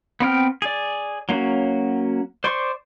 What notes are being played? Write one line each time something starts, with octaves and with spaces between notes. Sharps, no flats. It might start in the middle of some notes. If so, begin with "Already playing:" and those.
B3 C4 G5 F6
G#4 D5
F#3 A#3 C#4 F#4
C5 D5 C6 C#6